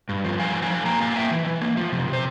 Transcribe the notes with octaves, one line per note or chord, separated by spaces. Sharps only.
G2
F3
G2 F5 G#5
F3
F5 G#5
F3
A#3 G5 A#5
A#3 F5 G#5
A#3 E5 G5
E3
E3
A#3
F3
C3
C3
C5